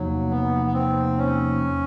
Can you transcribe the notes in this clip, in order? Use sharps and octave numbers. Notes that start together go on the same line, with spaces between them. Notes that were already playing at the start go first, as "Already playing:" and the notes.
Already playing: E2 C3 F3 F#3 A#3 D#4
B3
B3
C4
C#4